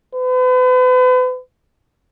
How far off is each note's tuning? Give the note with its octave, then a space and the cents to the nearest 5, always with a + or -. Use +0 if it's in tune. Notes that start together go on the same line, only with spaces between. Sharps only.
B4 +40